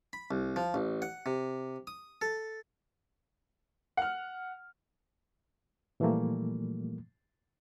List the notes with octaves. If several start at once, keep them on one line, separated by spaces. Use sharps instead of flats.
B5
C2
F3
A1
F#5
C3
D#6
A4
F#5 F6
A#2 E3 F3 G3 A3 A#3